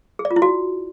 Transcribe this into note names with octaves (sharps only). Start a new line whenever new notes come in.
G#4
D5
F4
E4
F#4